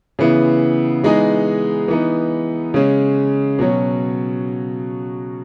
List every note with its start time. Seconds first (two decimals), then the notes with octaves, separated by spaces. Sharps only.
0.19 C#3 E3 B3 E4
1.03 E3 G#3 B3 D#4 G#4
1.88 E3 B3 D#4
2.74 C#3 G#3 C#4
3.59 B2 F#3 C#4